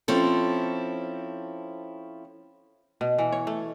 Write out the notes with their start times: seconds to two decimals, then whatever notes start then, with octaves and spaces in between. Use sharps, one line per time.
0.08 F3 C4 C#4 E4 A4
3.01 B2
3.19 E3
3.32 C#5
3.47 A3